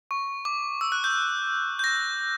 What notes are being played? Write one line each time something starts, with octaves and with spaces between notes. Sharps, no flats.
C#6
D6
E6
F#6
G6
G6
A#6